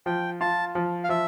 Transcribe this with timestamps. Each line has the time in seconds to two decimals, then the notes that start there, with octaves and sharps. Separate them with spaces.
0.06 F3 G5
0.41 F4 A5
0.75 F3
1.04 F5
1.09 F3 E5